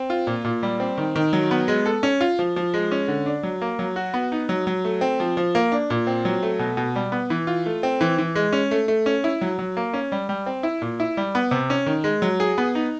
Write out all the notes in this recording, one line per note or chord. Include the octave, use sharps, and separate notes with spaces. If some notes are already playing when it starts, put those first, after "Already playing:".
Already playing: C4
F4
A#2
A#2
G3
C4
D#3
D#3
F#3
B3
G#3
A4
C#4
F4
F3
F3
G#3
C#4
D3
D4
F#3
A#3
F#3
F#4
B3
D#4
F#3
F#3
A3
C4
F3
F3
A#3
D4
A#2
C4
F#3
A3
B2
B2
G3
B3
E3
F4
A3
C4
E3
E3
G#3
C#4
A3
A3
C#4
E4
F#3
F#3
A#3
C#4
G3
G3
C4
E4
A#2
E4
G3
B3
C3
C#4
D#3
G#3
F#3
G#4
B3
D#4